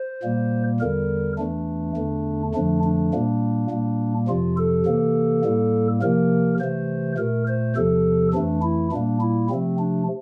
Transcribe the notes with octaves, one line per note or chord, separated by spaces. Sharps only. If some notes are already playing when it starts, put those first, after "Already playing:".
Already playing: C5
A#2 G3 A#3
E2 D3 G3 A#4
E2 E3 A3 D4
E2 D3 A3
F2 D3 F3 A3 D4
D4
A#2 G3 A#3
A#2 G3 A#3
F2 C3 F3 F4
A4
C3 E3 A#3
A2 G3 A#3
C3 F3 A#3 A#4
C3 E3 A3 C5
A#2 A3 A#4
C5
E2 C3 F3 A4
F2 E3 A3 D4
E4
A#2 G3 A#3 D4
E4
C3 F3 A3 C4
D4